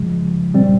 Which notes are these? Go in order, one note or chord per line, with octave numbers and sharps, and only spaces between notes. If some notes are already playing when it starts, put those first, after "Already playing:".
Already playing: C#3 F3 G#3
A#2 G3 C4